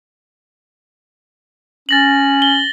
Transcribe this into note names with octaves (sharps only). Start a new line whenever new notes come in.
C#4 A6 A#6 F#7
G7